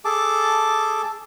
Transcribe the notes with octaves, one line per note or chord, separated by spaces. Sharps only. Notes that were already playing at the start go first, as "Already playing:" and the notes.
G#4 A4 A5 D6